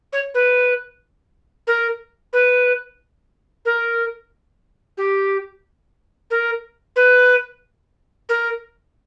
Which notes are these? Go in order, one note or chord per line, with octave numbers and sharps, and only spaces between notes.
C#5
B4
A#4
B4
A#4
G4
A#4
B4
A#4